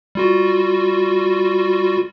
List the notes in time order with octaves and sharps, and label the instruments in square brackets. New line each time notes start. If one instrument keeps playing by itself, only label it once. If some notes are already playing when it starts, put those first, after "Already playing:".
[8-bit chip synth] G3 F4 F#4